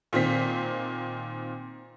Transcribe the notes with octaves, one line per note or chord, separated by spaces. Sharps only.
A#2 D#3 C4 B6